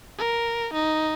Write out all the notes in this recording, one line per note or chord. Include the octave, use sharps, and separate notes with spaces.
A#4
D#4